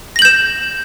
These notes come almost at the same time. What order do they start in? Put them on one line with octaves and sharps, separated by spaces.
A#6 F#7 G6 E7